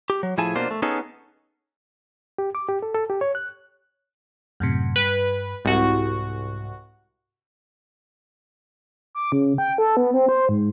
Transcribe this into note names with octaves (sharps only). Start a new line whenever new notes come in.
G4
F#3
A2 F3 E4 G#4 G#5 A5
B2 A#3 D4 F4 C5
A3
B3 C#4 D#4 G#4 A4
G4
D6
G4
A4
A4
G4
C#5
F#6
F#2 A2 C3
G2 B4
C2 G#2 F#4
D6
C#3
G5
A4
B3
C4
C5
G#2